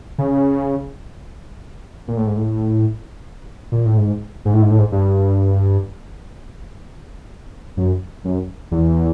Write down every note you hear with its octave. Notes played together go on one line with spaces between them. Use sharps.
C#3
A#2
A2
G#2
A2
A#2
A2
G#2
G#2
A2
G#2
A2
G#2
G2
F#2
F#2
E2